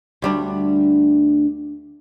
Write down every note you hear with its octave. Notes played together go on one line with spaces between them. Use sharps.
D2 G3 D4